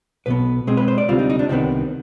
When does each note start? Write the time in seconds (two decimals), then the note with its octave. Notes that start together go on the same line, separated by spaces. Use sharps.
0.26 B1 B2 B3 B4
0.67 B2 G#3 C4 G#4
0.77 B4
0.88 C5
0.98 D5
1.08 D2 C3 G3 C4 F4
1.19 D#4
1.30 D#4
1.39 D4
1.49 C2 C3 D#3 B3 C4